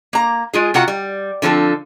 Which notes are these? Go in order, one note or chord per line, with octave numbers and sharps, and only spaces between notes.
A#3 A#5
G#3 F4 G#4
C3 F4 F#4 F#5 A#5
G3
D3 F3 C4 A4